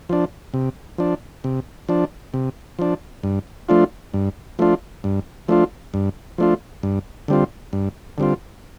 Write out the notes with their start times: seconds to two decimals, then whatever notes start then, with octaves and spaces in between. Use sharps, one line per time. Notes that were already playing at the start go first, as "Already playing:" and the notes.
0.09 F3 D4
0.54 C3
0.98 F3 D4
1.44 C3
1.89 F3 D4
2.34 C3
2.79 F3 D4
3.23 G2
3.69 F3 A3 D4 F4
4.14 G2
4.59 F3 A3 D4 F4
5.04 G2
5.48 F3 A3 D4 F4
5.94 G2
6.38 F3 A3 D4 F4
6.83 G2
7.28 D3 G3 C4 F4
7.73 G2
8.18 D3 G3 C4 F4